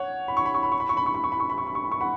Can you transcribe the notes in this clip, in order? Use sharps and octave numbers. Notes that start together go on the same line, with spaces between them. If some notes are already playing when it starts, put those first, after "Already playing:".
Already playing: C#5 F#5
B5
C#6
B5
C#6
B5
C#6
B5
C#6
B5
C#6
B5
C#6
B5
C#6
B5
C#6
B5
C#6
B5
C#6
F#5 B5